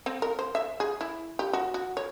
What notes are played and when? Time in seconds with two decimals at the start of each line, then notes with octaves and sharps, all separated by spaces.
0.06 C4
0.22 A#4
0.39 C5
0.55 E5
0.80 G#4
1.01 E4
1.39 G4
1.53 F#4
1.74 F#4
1.97 C#5